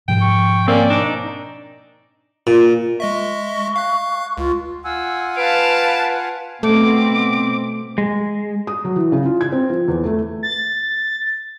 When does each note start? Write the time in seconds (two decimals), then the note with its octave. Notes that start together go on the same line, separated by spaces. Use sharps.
0.08 G#2 B2 F3 G5
0.21 C#6
0.68 A#3 C4 C#4 D5
0.90 D4 D#4
2.47 A#2
3.00 G#3 D#5 E5 C#6
3.76 F5 F#6
4.38 C#2 F4
4.84 F4 F#5 G#5 E6
5.37 B4 F5 A5 D7
6.63 B2 A3 C4 D6
7.98 G#3
8.67 D#6
8.85 F#3
8.96 E3
9.12 C#3
9.25 F4
9.41 G#6
9.52 C4
9.70 F3
9.88 E2
10.05 A3
10.43 A6